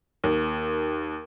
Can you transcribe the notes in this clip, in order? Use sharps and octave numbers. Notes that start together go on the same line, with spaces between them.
D#2